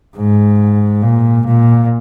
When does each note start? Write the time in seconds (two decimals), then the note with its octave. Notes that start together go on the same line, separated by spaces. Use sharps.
0.16 G#2
1.03 A#2
1.46 A#2